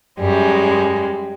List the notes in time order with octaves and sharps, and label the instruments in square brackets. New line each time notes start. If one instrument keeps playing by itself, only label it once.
[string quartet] F#2 G3 G#3